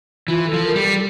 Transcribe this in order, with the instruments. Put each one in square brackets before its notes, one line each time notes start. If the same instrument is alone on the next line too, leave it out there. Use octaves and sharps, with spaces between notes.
[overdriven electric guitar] E3 [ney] F4
[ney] A4
[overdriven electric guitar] F3
[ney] A#4
[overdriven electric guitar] G3 [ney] A#4
[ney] A4
A4